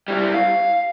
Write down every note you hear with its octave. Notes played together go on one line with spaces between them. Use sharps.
G3 E4
F5